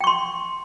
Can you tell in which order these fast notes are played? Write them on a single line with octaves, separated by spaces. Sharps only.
G5 C#6 C6